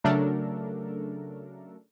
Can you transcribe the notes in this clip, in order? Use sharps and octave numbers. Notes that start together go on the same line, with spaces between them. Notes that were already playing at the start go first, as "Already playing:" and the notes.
C#3 F#3 A3 D4 A4 A#4